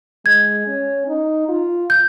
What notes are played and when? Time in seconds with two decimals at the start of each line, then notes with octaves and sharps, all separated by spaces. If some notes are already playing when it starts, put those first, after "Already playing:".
0.26 G#3 G#6
0.67 C#4
1.08 D#4
1.49 F4
1.90 G6